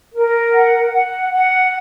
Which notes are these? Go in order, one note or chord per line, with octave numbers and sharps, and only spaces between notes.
A#4
F#5
F#5
F#5